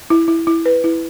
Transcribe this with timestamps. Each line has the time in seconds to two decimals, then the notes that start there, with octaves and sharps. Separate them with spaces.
0.10 E4
0.28 E4
0.47 E4
0.66 B4
0.84 E4